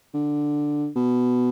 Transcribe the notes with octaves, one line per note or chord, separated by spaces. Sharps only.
D3
B2